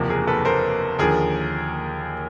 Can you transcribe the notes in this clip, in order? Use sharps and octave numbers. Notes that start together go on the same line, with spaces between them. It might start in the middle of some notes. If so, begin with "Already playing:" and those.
Already playing: F#1 E2 C3 F3 A#3
G#4 A#4
A4 B4
A#4 C5
D#2 D3 F3 G#4 A#4